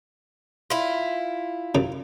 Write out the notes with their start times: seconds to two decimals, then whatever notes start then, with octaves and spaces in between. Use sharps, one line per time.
0.70 E4 F4
1.75 F#2 C#3